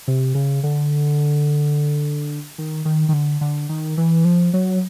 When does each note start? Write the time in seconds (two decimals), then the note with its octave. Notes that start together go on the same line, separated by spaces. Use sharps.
0.08 C3
0.35 C#3
0.64 D3
2.58 D#3
2.85 D#3
3.09 D#3
3.13 D3
3.41 D3
3.69 D#3
3.97 E3
4.25 F3
4.54 F#3